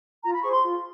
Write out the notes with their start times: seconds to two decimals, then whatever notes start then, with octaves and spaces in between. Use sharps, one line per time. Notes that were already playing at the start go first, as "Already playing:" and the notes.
0.22 F4 A#5
0.33 B5
0.42 G#4 C5 C#6
0.52 C6
0.62 F4